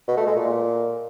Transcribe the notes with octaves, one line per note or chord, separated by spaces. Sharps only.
B2
A3
G#3
A#2